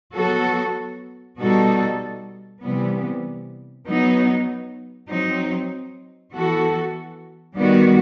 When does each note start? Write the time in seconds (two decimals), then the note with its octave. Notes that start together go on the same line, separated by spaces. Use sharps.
0.14 F#3 B3 F#4 A4
1.38 B2 G3 D#4 F#4 A4
2.62 C3 E3 G3 B3
3.85 F#3 B3 D#4
5.09 F#3 C4 D#4
6.32 E3 B3 F#4 A4
7.56 D#3 G3 B3 F#4